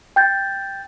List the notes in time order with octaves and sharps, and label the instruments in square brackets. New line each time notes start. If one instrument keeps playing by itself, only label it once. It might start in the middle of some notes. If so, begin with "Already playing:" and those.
[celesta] G5 G6 A6